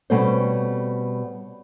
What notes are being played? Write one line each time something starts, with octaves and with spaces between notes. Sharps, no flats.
B2 G3 A3 C4 C#4 C5